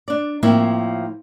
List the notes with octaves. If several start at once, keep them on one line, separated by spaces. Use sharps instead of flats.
D4 D5
A2 F3 A#3 C4 E4